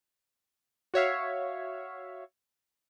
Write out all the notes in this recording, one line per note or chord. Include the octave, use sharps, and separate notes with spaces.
F#4 C#5 E5 F5